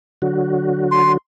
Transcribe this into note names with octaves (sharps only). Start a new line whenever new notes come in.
D3 F#3 F#4
C6